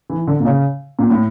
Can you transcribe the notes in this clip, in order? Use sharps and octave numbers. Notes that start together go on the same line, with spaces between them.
E3
D3
A#2
C#3
A#2
A2